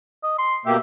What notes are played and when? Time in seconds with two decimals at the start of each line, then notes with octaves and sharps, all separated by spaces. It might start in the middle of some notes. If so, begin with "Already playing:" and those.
0.23 D#5
0.38 C6
0.66 B2 A#3 G4 E5